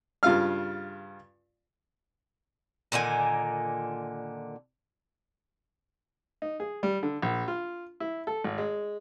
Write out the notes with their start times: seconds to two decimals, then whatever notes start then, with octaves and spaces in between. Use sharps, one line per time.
0.23 G2 C#3 F4 F5 F6
2.92 A#2 D3 D#3 G#5
6.42 D#4
6.60 G#4
6.83 G3
7.03 D3
7.22 A#1
7.48 F4
8.00 E4
8.27 A4
8.44 G#1
8.58 G#3